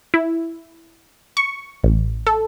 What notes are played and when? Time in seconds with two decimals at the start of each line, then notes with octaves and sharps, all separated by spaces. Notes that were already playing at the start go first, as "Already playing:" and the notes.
0.14 E4
1.37 C#6
1.83 A1
2.27 A4